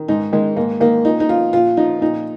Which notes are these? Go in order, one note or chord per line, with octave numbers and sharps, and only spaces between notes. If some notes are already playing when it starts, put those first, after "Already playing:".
Already playing: D#3
G#2 D#4
D#3 G#3
G#2 A#3
D#3 A#3
A#2 D#4
D#4
F3 F4
A#2 F4
F3 D#4
A#2 D#4